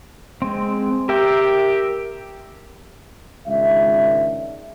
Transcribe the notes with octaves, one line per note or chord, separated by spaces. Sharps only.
G#3 C4
G4 A#4 E5 G5
C#2 G#2 D#3 D4 E5